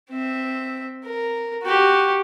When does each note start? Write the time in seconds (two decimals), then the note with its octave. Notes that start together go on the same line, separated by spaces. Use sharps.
0.11 C4 E5
1.04 A#4
1.63 F#4 G4